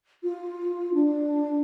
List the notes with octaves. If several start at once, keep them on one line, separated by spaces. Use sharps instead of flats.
F4
D4